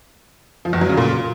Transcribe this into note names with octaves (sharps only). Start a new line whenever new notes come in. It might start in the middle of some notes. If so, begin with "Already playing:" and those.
F3
E2
F#3
C#3
A#2